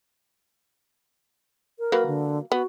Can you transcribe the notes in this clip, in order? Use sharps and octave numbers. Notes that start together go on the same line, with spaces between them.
A#4
F#3 A#3 B4
D3
B3 F#4